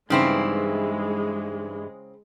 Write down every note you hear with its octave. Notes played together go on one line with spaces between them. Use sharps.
G2 C#3 E3 G#3 C4 D#4 E4